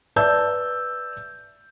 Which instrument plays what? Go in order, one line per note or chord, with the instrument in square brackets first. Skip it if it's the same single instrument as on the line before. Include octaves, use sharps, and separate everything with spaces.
[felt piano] B4 D5 E5 A5 E6 G6